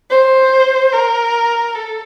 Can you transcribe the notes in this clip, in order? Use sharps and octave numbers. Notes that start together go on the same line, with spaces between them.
C5
A#4
A4